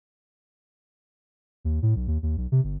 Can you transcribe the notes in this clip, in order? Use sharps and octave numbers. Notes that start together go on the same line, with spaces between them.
D#2
A2
B1
D#2
D#2
B1
C3
G1